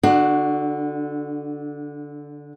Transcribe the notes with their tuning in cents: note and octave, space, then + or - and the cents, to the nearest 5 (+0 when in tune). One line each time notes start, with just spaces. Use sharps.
D3 -10 D4 +25 F#4 +0